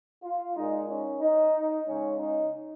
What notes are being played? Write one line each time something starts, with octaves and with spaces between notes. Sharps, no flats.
F4
A#2 G#3 D#4
C#4
D#4
C#3 G#3 C#4
D#4